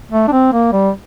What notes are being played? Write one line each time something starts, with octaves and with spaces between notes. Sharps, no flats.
A3
D4
C4
A#3
G3